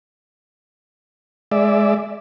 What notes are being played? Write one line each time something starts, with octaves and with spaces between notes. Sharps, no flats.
G#3 D5 E5